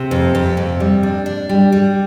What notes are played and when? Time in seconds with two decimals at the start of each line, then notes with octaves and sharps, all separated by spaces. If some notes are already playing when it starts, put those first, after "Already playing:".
Already playing: C3
0.11 F2
0.35 F2
0.57 C3
0.80 G3
1.03 D4
1.26 D4
1.49 G3
1.72 G3